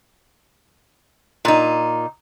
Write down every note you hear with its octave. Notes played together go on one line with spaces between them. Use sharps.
A#2 D#4